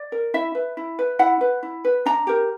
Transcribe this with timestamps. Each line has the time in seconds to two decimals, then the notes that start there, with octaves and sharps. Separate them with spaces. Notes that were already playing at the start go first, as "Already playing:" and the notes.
Already playing: D5
0.12 A#4
0.34 E4 E5
0.55 B4
0.77 E4
0.99 B4
1.19 E4 F#5
1.41 B4
1.63 E4
1.85 B4
2.06 D4 A#5
2.27 G4 A#4